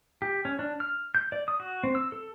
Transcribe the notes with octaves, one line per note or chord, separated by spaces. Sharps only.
G4
C#4
D4
F6
G6
D5
D#6
F#4
C4
E6
A4